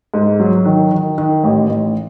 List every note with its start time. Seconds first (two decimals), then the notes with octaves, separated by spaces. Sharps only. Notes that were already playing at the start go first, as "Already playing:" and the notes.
0.14 G#2
0.40 F#3
0.65 D#3
0.91 D#3
1.18 D#3
1.44 A1
1.69 A1